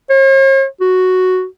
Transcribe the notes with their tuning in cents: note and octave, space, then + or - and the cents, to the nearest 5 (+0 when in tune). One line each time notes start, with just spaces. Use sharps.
C#5 -45
F#4 +0